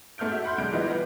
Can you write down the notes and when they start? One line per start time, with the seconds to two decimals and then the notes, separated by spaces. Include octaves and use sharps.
0.18 G#2 A3 F6 G6 D7
0.31 F#4 E5
0.44 F#5 B5 C6 G6
0.58 B1 D3 G3 G#3 F#6 D7
0.73 E3 G3 F4 G4 D#5
0.90 B3 B4